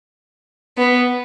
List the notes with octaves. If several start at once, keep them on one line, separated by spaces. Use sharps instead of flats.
B3